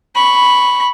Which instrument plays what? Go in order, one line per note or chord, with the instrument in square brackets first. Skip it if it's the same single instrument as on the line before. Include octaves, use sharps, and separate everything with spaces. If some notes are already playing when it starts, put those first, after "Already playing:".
[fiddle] B5 C#6